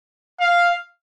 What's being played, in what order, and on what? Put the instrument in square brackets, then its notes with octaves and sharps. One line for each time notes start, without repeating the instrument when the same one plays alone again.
[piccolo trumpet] F5